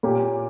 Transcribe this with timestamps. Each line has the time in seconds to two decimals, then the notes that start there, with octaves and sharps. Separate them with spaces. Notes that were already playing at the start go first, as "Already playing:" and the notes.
0.03 A#2 A#3 C#4 G4